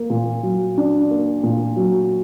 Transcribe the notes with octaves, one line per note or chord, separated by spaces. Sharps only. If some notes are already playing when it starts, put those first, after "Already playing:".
Already playing: A#3
A#2
F#3
D4
A#3
A#2
F#3